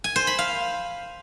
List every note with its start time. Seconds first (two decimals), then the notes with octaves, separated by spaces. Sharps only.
0.04 G#5
0.16 C5
0.27 B5
0.39 F5